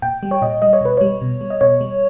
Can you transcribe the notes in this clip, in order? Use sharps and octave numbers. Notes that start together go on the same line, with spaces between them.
A#2 G5
G3
C#5
A#2 D#5
G3 D#5
C#5
B2 B4
G3 C#5
B2
G3
D#5
B2 C#5
G3